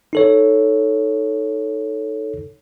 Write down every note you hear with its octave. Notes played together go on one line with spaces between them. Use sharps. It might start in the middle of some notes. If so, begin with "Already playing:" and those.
D#4 A4 C#5